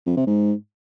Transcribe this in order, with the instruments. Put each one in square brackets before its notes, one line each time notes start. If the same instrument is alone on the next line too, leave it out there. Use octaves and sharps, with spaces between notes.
[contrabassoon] F2
C3
G#2